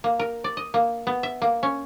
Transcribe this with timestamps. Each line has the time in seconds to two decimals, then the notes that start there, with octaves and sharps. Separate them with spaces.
0.04 A#3
0.19 A#4
0.44 D5
0.57 D#5
0.74 A#3
1.07 B3
1.23 E5
1.42 A#3
1.63 C#4